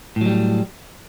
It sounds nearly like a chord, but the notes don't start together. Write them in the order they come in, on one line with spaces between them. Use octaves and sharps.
A2 F#3 G3